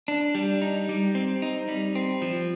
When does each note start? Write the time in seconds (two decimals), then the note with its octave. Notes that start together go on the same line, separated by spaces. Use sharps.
0.08 D4
0.35 G3
0.62 D#4
0.89 G3
1.15 C4
1.42 D#4
1.68 G3
1.95 C4
2.22 F3